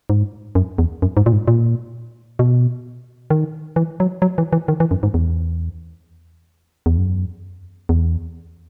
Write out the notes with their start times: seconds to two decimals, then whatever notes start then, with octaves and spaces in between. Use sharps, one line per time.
0.10 G#2
0.55 F#2
0.78 E2
1.02 F#2
1.17 G#2
1.26 A#2
1.33 G#2
1.48 A#2
2.39 B2
3.30 D#3
3.76 E3
4.00 F#3
4.22 F#3
4.38 E3
4.53 E3
4.68 D#3
4.80 E3
4.91 F#2
5.03 G#2
5.14 E2
6.86 E2
6.98 F#2
7.89 E2